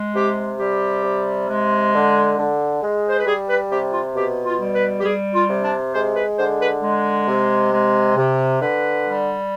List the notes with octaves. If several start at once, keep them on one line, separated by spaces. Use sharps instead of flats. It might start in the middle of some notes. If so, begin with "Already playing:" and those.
Already playing: G#3
C3 G4
G3 G4
C3
G#3
D3
D3
G#3
C5
B4
G3 G#4
B4
C3 G4
F4
B2 G4
F4
G3
B4
G4
G3 G#4
F4
C3
D4
G#3 C5
B4
D3 C5
B4
G#3
C3
G#3
C3
D3 B4
G3